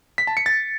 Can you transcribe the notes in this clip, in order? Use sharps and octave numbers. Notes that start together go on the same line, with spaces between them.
B6
A5
C#7
A6